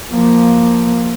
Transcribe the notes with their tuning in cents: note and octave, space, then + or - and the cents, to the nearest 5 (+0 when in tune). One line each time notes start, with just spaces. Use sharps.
F3 +0 A#3 +5